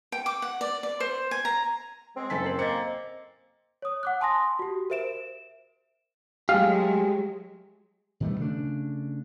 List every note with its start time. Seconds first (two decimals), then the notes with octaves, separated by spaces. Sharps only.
0.12 G5
0.26 D6
0.42 F#5
0.61 D5
0.83 D5
1.00 C5
1.31 G#5
1.45 A#5
2.16 G#3 C4
2.30 F#1 A4 G#5 B6
2.45 C4 A#4 C7 F#7
2.59 A#3 C5 D#5 A6 C#7
3.82 C#5 D#6
4.03 F#5 D6 F#6
4.21 G#5 A5 C6 D#6 A#6
4.59 F#4 G4
4.90 A#4 C5 E5 D7 E7
6.49 F#3 G#3 A3 G4 G#4 F5
8.20 B2 D#3 G3 A3
8.38 C#3 A3 D4